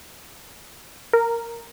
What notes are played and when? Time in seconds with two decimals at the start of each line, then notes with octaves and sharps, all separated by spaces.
1.13 A#4